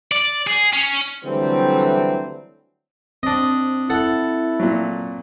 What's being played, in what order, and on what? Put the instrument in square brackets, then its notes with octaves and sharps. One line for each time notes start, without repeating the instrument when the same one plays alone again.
[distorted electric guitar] D5
G#4
C#4
[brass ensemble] D3 E3 F#3 G3 A3 C4
[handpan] C4 [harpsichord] D4 D#5
[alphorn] E4 [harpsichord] A4 F#5
[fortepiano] A#2 F#3